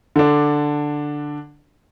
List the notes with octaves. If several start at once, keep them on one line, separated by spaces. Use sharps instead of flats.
D3 D4